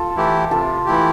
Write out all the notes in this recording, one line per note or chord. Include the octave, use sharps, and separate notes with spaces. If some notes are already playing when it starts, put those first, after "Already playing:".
Already playing: F4 A4
E3 A3 E4 G4
C3 F4 A4
E3 A3 E4 G4